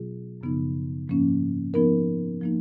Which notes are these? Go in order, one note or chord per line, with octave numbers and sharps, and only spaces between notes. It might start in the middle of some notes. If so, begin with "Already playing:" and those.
Already playing: B2 F#3 B3 F4 G#4
F#2 C#3 F3 B3 D#4
G#2 F3 A#3 C#4
F3 B3 D#4 A#4
F3 A#3 D#4